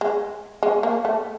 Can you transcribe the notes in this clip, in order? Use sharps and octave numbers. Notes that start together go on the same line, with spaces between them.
G#3
G#3
A#3
A3